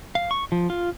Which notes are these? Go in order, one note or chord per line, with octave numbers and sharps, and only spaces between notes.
F5
C#6
F3
F4